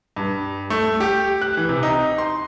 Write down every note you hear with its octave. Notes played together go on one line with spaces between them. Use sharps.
G2
A3
G4
F#6
E3
C3
D#4
C6